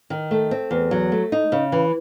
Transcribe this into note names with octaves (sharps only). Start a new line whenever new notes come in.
D#3
A3
C4
E2
F#3
A3
D#4
C#3
E3